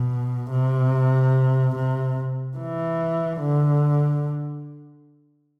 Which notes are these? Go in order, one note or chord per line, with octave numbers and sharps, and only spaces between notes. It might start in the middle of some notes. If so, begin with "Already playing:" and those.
Already playing: B2
C3
C3
E3
D3